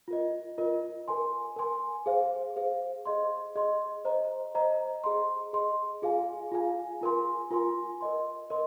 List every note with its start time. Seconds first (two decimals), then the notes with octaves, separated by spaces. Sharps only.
0.08 F4 A#4 D#5
0.58 F4 A#4 D#5
1.08 A#4 G#5 C6
1.56 A#4 G#5 C6
2.06 G#4 C5 F5
2.56 G#4 C5 F5
3.06 G#4 D#5 C6
3.56 G#4 D#5 C6
4.05 C5 D#5 A#5
4.55 C5 D#5 A#5
5.04 G#4 D#5 C6
5.53 G#4 D#5 C6
6.02 F4 G#4 F5 G#5
6.52 F4 G#4 F5 G#5
7.02 F4 A#4 G#5 C6
7.51 F4 A#4 G#5 C6
8.01 A#4 D#5 C6
8.50 A#4 D#5 C6